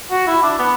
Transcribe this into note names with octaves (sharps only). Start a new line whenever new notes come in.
F#4
E4
D4
B3